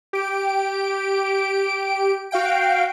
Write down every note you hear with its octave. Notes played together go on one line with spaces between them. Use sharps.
G4 D7
F#4 F5 G5 D7